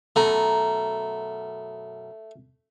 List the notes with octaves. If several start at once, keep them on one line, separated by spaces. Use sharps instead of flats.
F#2 B2 A3 A#5